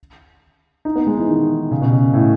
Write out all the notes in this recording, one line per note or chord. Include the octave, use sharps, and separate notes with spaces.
D#4
B3
G#3
E3
D#3
C#3
B2
C#3
A2